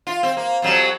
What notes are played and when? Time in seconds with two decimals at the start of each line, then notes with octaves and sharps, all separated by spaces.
0.07 F4
0.23 C4
0.37 A#3
0.62 F2 F#3 G3